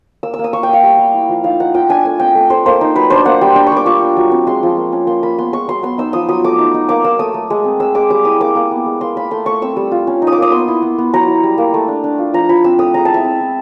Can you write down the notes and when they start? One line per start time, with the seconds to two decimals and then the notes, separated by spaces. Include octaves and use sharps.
0.23 A#3 E6
0.34 E6
0.39 A#3
0.44 D#6
0.53 A#3 C#6
0.63 G5
0.69 A#3 F5
0.83 G3
0.98 G3
1.14 E4
1.29 F3
1.44 D#4 F5
1.60 D#4 F#5
1.74 F4 G5
1.89 D4 G#5
2.05 A3 G#5
2.20 C4 G5
2.35 A3
2.50 A3 C5
2.66 A#3 C5
2.81 D#4
2.95 F#3 B4
3.10 D4 C5
3.25 A#3 F#5
3.41 G3 G5
3.56 D4 G5
3.67 C#6
3.72 G3 D6
3.86 F4 C#6
4.02 D4
4.17 F#3
4.31 C4
4.47 G#3 C6
4.63 F3
4.77 A#3
4.92 C#4
5.07 A#3 C6
5.23 A#3 B5
5.38 B3 C6
5.52 G#3 C#6
5.68 F#3 C6
5.83 B3 C6
5.98 D#4 E6
6.13 F3 D#6
6.29 F#3 D#6
6.44 A3 D6
6.59 D#4
6.74 D#4
6.89 A#3 D6
7.04 A#3 E6
7.19 A3 D#6
7.34 A3
7.50 G#3
7.64 C4
7.80 G#3 E6
7.95 G#3 D6
8.10 G3 D6
8.25 E4 D#6
8.40 A#3 D6
8.56 A#3
8.71 B3
8.86 G#3
9.01 A#3 C6
9.16 A#3 B5
9.31 A3 C6
9.46 A3 C#6
9.62 C4 E6
9.77 G3
9.91 F4
10.07 C#4
10.22 D#4
10.27 D#6
10.32 D6
10.38 A#3 D#6
10.52 B3 C6
10.68 E4
10.82 B3
10.98 B3
11.14 F#3 A#5
11.28 E4
11.43 G3
11.58 A#3
11.74 A3
11.88 D4
12.04 D4
12.18 F4
12.34 F3 A#5
12.49 F3 B5
12.64 C4 E6
12.79 A3 D#6
12.94 G#3 A#5
13.05 E4 A5
13.14 E5
13.24 C4
13.41 E4